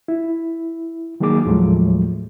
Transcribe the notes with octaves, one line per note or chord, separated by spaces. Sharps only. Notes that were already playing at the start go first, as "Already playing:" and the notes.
E4
D#3 F#3 A#3 D#4 G#4 D6
D#2 A2 F3 F#3 G#3 A3